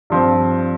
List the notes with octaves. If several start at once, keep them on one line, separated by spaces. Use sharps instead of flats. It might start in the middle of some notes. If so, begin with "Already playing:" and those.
G2 F3 C4